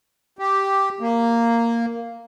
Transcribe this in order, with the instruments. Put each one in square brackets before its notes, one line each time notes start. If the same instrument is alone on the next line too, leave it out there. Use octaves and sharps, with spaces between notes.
[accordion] G4
A#3